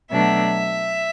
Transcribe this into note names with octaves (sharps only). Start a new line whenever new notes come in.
B2 F#3 A3 D4 E5